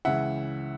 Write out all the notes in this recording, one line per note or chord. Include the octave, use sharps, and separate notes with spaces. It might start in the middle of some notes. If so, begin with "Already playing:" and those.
C#2 C#3 E3 E5 F#5